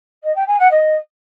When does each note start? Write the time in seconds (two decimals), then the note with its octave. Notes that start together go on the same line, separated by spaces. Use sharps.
0.23 D#5
0.35 G5
0.47 G#5
0.59 F#5
0.71 D#5